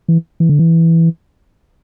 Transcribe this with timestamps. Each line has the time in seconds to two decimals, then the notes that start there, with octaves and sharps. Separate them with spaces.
0.08 E3
0.40 E3
0.49 D3
0.59 E3